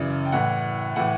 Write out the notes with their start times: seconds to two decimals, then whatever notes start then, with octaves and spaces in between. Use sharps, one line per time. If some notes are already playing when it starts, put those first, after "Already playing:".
Already playing: F#2 C#3 E3 D5
0.25 G5
0.32 A2 E3 F#5
0.96 A2 E3 F#5